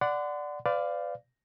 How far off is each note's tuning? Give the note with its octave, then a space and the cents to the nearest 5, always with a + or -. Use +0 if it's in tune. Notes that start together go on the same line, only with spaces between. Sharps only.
D5 +0 F#5 +0 C6 -40
B4 +40 D5 +0 F5 +0